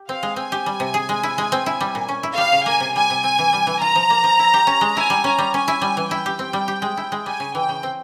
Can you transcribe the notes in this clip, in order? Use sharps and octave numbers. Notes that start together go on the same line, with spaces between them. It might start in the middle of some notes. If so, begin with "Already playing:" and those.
Already playing: G4
C4 F5
G#3
C4 G#5
G4
G3
C3
G#4
G#3
E4
G#3
C4
E4
G3
A#2
C#4
E4
G3 F5
C#3
A#3 G#5
C3
G3 G#5
C3
C4 G#5
E3
G3
E3
F4 A#5
F3
A#3
F3
E4
G4
C#4
G#3
E4 G#5
G3
C#4 A#5
G3
C#4 G#5
E4
G3
E3
E4 G5
G4
C4
G3
G4
G#3
E4
G#3
G3 G#5
C#3
E3 G5
C#3
C4